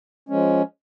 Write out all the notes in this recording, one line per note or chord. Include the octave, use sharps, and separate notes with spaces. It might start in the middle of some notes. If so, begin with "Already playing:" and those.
F3 G#3 C#4